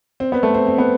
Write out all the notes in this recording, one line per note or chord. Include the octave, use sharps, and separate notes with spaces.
C4
B3
A3
C4
C4
B3